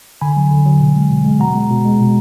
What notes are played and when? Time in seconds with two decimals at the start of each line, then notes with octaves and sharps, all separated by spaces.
0.21 D3 G#5 B5
0.37 F#3
0.51 D3
0.66 F#3
0.80 B2
0.96 G#3
1.10 B2
1.25 G#3
1.40 B2 F#5 A#5
1.55 G#3
1.70 B2
1.85 G#3
2.00 B2